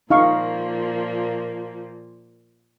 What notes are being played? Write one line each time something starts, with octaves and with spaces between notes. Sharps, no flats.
A#2 F3 A#3 D#4 F5 C#6